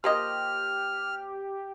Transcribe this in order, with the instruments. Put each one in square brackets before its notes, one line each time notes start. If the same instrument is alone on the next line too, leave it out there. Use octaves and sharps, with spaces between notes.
[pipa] F3 A#3 D#5 [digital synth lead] G4 [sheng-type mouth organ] F6